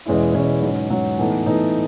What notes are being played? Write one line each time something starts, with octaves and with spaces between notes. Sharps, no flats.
E2 B2 G#3 C#4 E4
E2 B2 G#3 C#4 E4
G#2 F#3 C#4
G#2 F#3 C#4
A2 E3 B3 D#4 A4
A2 E3 B3 D#4 A4